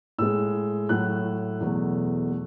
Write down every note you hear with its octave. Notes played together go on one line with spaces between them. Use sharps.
A2 G#3 E6
A2 F#3 A3 F#6
E2 B2 F#3 A3
A3